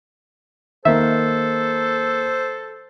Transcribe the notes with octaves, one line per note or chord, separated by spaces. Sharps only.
D#3 A#3 A4 C5 E5